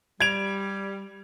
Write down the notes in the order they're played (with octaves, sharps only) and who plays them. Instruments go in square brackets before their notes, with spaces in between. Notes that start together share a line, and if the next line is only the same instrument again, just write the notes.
[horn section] G3 [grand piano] G#6 D7 F7